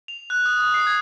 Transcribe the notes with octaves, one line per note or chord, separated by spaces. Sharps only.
F7
F#6
D#6
D#6
C7
G#6